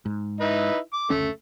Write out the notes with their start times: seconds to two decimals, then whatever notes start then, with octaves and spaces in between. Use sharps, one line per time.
0.06 G#2
0.41 D#4 E4 B4
0.93 D6
1.10 F#1 D2 A3 C#4